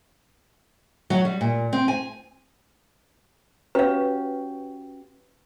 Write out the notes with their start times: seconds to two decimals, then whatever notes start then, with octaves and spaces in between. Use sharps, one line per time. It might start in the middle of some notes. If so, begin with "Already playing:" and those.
1.10 F#3
1.25 G3
1.41 A#2
1.73 C4
1.88 G#5
3.75 C#4 F#4 G4 B4 F5